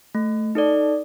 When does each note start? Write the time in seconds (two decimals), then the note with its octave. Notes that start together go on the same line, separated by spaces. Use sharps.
0.15 A3
0.55 D#4 A4 D5